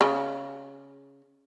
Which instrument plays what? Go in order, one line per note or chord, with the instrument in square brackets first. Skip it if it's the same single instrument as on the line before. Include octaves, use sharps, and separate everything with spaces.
[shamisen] C#3